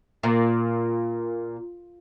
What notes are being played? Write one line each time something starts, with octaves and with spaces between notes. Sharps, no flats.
A#2